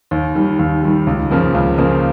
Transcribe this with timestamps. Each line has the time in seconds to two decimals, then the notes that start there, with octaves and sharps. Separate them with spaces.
0.11 D#2
0.35 D#3 G3
0.59 D#2
0.83 D#3 G3
1.07 C#2
1.31 C#3 F3 A#3
1.54 C#2
1.78 C#3 F3 A#3